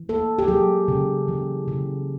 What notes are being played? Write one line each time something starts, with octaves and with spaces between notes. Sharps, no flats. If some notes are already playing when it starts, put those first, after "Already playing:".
Already playing: E3
A#3 A4
G4
F#3 G#4
C#3
E3
C#3